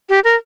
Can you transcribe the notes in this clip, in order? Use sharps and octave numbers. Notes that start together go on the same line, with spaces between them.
G4
A#4